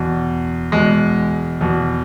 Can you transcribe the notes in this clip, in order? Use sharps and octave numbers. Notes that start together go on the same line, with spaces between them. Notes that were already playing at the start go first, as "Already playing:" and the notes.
Already playing: E2 B2
E2 B2 G#3
E2 B2